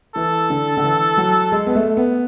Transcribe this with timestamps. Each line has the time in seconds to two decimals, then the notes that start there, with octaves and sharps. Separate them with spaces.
0.15 E3 A4
0.50 D3
0.77 D3
0.84 E3
1.17 F#3
1.52 G#3
1.66 B3
1.75 A3
1.97 B3